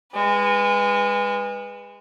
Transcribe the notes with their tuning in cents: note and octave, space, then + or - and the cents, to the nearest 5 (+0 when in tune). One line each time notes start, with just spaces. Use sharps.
G#3 -30 B4 +0